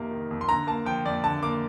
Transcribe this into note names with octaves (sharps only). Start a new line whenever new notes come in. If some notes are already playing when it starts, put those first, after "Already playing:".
Already playing: F2 C3 D#3 A#3
D#3
F2
C6
D3 A#5
A#3 A5
F3 G5
F2 D5
D3 A5
A#3 D6